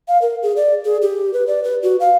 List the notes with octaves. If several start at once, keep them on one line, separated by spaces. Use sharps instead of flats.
F5
A#4
G#4
D5
G#4
G4
B4
D5
B4
F#4
F5